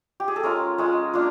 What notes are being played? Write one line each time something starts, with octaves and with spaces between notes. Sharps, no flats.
G4
G#4
A4
G#3 C#4 F4 A#4
G#3 C#4 F4
A#3 D4 F4